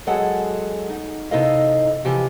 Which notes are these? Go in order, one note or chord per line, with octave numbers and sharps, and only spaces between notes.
F#3 G#3 G#4 A4 F#5
D#4
C3 D#4 E4 A4 D#5 F5
C3 E3 F3 G4